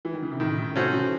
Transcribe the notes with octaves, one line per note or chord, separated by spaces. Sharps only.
E3
D#3
C#3
C3
A2 D#3
A2 C#3
C3 D#3 A3 C#4 F#4 C5
C#3 E3